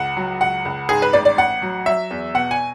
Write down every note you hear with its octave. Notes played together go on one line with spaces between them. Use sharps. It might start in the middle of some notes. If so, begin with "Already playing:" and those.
Already playing: C#2 F#5
F#3
C#2 F#5
C#2
G#2 G#4
B4
A1 D5
D5
A1 F#5
F#3
F#3 E5
E2
B2 F#5
G#5